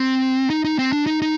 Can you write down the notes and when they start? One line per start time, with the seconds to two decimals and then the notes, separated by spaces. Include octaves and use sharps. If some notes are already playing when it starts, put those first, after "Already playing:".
Already playing: C4
0.50 D#4
0.65 D#4
0.79 C4
0.92 D4
1.06 D#4
1.22 D#4